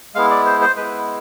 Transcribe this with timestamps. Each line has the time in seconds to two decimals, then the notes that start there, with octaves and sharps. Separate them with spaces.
0.15 G#3 B3 E4 F5
0.31 D5
0.46 C5
0.61 C5
0.77 G#3 B3 E4 B4